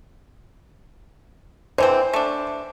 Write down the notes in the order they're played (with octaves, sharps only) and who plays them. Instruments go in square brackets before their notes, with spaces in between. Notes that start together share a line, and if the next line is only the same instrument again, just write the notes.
[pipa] D3 E3 C4 [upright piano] C5
[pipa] A3 D4